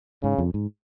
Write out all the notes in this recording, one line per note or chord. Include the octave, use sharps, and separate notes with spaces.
G#2 C#3
F2
G#2